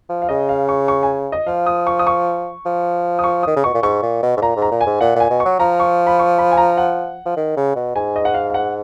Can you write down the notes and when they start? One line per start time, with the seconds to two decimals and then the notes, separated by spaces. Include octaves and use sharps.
0.09 F3
0.22 F5
0.29 C#3 D#5
0.49 F5
0.69 C#6
0.88 C#6
1.03 G#5
1.32 D#5
1.47 F3 F5
1.66 D#6
1.87 C#6
1.99 D#6
2.07 C#6
2.65 F3
3.19 D#6
3.24 C#6
3.43 D#3 D#6
3.56 C#3
3.64 B2 C#6
3.74 A#2
3.82 G#2 C#6
4.02 A#2
4.23 B2
4.37 G#2
4.41 A#2 A#5
4.56 G#2
4.62 A#5
4.72 A#2
4.81 G#5
4.86 G#2
5.01 A#2 F#5
5.15 A#2 G#5
5.30 B2
5.40 C#6
5.45 F#3
5.59 F3 A#5
5.80 C#6
6.07 B5
6.19 C#6
6.38 B5
6.52 G#5
6.57 A#5
6.77 F#5
7.25 F3
7.36 D#3
7.56 C#3
7.76 B2
7.95 G#2 G#5
8.16 D#5
8.25 F#5
8.34 F5
8.50 F5
8.54 F#5